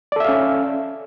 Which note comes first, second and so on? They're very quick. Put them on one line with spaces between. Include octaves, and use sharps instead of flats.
D5 A4 E5 F5 C#4